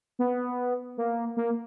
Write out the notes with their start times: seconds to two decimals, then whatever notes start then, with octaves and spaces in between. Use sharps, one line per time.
0.19 B3
0.97 A#3
1.37 A#3